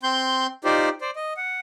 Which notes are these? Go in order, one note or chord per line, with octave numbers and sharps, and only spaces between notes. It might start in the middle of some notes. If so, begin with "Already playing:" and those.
C4 C6 G6
D#4 F4 G4 C5 D5
C5 D5
D#5
F#5